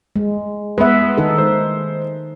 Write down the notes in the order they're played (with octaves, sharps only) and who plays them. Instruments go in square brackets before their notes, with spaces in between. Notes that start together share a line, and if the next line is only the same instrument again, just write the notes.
[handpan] G#3
[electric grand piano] G#3 B3 [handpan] B4 E5
[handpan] D#3 D#4 A4
[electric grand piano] G#3 C5